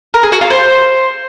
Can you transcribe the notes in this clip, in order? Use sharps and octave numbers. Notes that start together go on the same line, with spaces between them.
A#4
G#4
F#4
F4
C5